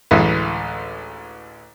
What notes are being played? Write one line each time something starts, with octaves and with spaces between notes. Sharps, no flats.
A1 D2 E3 G#3 B4